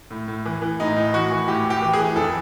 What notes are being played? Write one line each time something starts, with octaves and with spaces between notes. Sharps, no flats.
A2
A2
E3
E3
A2 D#4
A2
E3 F#4
E3
A2 G4
A2 G4
E3
G#4
E3
F2 A4